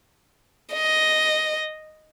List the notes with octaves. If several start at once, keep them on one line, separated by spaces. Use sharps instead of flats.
D#5